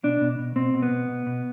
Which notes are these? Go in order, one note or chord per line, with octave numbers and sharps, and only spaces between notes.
B2 D4
B2
B2
B2 C4
B2
B3
B2
B2
B2